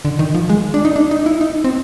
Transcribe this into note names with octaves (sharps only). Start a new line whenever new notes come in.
D3
D#3
F3
G#3
D4
D#4
D4
D#4
E4
D#4
C4